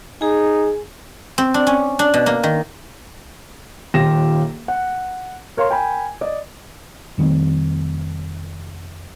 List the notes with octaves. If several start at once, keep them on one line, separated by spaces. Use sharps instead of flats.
D#4 G#4 G#5
C4
D4
C#4
D4
B2
A#3
D#3
D#1 D#2 F4 G4 A#6 E7
F#5
A#4 C#5 F5 C6
A#4 G5 G#5 B5
D5 D#5
F1 D#3 G3 C4